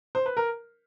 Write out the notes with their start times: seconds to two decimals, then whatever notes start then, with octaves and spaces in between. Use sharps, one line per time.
0.15 C5
0.26 B4
0.37 A#4